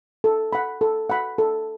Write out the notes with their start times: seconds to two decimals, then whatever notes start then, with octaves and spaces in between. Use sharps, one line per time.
0.24 A4
0.53 F#5 B5
0.81 A4
1.10 F#5 B5
1.38 A4